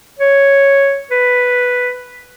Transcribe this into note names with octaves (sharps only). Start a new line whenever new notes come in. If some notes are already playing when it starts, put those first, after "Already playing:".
C#5
B4